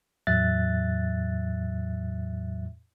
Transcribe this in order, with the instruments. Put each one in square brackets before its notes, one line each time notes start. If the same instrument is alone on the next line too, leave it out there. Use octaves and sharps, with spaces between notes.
[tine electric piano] E2 A2 F#3 E5 F#6 A6